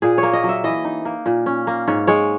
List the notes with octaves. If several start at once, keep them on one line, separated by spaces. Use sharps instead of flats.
A#2 G#4
C#5
A#3
D#5
F#3
E5
E3 D#5
D#4
A#3
A#2
C#4
A#3
G#2 C#5
G#3 C#5